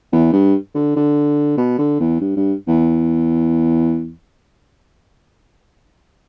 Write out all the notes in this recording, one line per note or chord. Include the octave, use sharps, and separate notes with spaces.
E2
G2
D3
D3
B2
D3
E2
G2
G2
E2